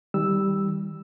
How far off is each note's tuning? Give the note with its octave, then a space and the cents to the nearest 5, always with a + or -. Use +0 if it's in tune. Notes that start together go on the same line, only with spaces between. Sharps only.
D#3 +40 G3 +0 E6 +0